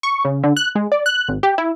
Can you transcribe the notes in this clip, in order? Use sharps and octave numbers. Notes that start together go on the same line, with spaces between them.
C#6
C#3
D3
F#6
G#3
D5
F#6
G#1
G4
E4